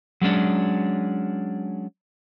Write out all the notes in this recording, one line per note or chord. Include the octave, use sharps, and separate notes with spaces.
F#3 G#3 C#4 D4